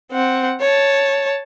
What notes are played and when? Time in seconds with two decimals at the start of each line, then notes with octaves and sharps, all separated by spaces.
0.12 C4 F#5
0.61 C#5 A5